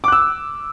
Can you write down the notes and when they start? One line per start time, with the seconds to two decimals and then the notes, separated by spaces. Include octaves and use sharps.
0.04 D6
0.08 F#6
0.12 E6